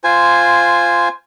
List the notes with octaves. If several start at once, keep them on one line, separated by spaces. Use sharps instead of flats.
F4 C5 G#5